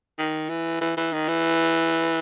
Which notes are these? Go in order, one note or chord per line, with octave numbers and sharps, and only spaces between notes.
D#3
E3
E3
E3
D#3
E3